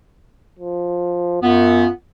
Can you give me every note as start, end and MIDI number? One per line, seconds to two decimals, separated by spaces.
0.59 1.41 53
1.43 1.86 42
1.43 1.86 59
1.43 1.91 65